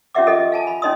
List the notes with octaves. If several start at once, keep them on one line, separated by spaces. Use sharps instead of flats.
C#4 F4 G4 E5 F#5 D6
G#4 A4 D#5
F5 G#5 A5
B5
C#4 D#4 D#5 C6 D#6